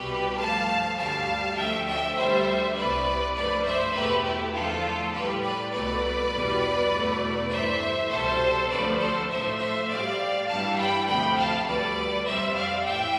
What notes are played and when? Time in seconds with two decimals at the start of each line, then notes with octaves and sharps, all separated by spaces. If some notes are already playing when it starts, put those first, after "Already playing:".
Already playing: C2 B2 G3 G4 B4
0.38 G2 F3 A3 F5 A5
0.97 D2 D3 G3 F5 A5
1.57 D2 D3 F3 A3 E5 G5
1.86 E5 G5
2.16 D2 D3 G3 C5 E5
2.76 C2 C3 G3 B4 D5
3.35 G2 F3 A3 B4 D5
3.65 C5 E5
3.94 E2 B2 A3 G4 B4
4.24 E4 G4
4.54 E2 D3 F3 A3 F4 A4
5.13 A2 G3 G4 B4
5.43 B4 D5
5.73 C2 B2 A3 B4 D5
6.32 E2 B2 G3
6.91 E2 B2 A3
7.51 G2 E3 A3 C5 E5
8.10 C2 B2 G3 A4 C5
8.70 D2 D3 F3 A3 B4 D5
8.99 A4 C5
9.29 A2 F3 A3 C5 E5
9.59 C5 E5
9.88 A2 G3 D5 F5
10.48 G2 E3 G3 F5 A5
10.78 G5 B5
11.07 D2 C3 F3 A3 G5 B5
11.37 F5 A5
11.67 D2 D3 G3 B4 D5
12.26 F2 C3 G3 C5 E5
12.56 D5 F5
12.85 A2 E3 E5 G5